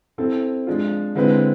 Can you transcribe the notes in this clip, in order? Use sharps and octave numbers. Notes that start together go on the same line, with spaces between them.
C4 E4 A4 C5
F3 G#3 D4 F4
D3 G#3 C4 E4 B4